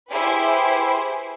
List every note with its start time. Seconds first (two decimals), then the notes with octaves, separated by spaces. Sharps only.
0.11 E4 G4 G#4 B4 C5 G#5